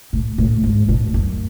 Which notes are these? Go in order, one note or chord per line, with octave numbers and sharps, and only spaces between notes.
A2
A2
G#2
A2
F#2